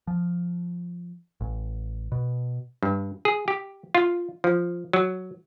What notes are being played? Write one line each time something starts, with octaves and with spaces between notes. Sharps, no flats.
F3
A1
B2
G2
G#4
G4
F4
F3
F#3